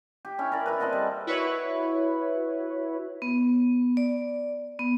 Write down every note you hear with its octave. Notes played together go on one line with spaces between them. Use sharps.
G4
C#4 E4 C#5
A#4 D5
E4 A#4 B4
C4 A4 D#5 F#5
G3
E4 F#4 B4 C#5
B3
D5
B3